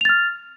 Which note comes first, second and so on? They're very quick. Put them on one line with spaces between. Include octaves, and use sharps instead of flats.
F7 A6 F6